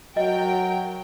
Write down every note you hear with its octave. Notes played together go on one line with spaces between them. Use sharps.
F#3 A#4 D#5 G5